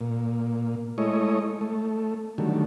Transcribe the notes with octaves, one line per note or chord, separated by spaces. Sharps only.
A#2
G#3 A3 E4 C#5 D#5
A3
D3 D#3 F#3 G3 A3